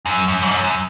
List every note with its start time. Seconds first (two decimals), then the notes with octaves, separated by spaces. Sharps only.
0.06 F#2
0.28 F#2
0.42 G#2
0.51 F#2
0.64 F#2